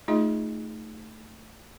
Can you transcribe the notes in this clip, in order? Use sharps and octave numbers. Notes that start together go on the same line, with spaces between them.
A3 D#4 F4 G#4 D#5